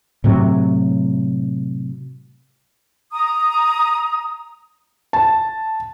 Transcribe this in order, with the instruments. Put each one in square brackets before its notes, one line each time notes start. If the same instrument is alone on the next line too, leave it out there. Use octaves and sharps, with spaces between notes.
[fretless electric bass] A2 C3 F#3
[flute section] A#5 D#6
[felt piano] A5